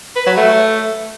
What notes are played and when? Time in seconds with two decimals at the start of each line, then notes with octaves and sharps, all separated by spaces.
0.16 B4
0.27 F#3
0.37 A3